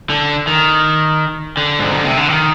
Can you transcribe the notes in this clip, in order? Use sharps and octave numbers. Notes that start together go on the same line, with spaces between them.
D3
D#3
D3
G#2
B2
C3
D3
D#3